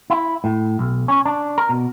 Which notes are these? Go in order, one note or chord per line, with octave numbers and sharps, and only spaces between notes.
E4
A2
B1
C#4
D4
A#4
B2